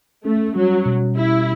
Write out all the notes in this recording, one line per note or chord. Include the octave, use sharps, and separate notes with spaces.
A3 C#4
F#3 G3
B2
E4 G4